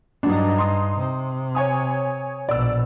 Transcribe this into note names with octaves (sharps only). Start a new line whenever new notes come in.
G2 F#3 D4 D#4
C6 D#6
C3
C#5 G#5 D#6
A#1 B2 D5 E6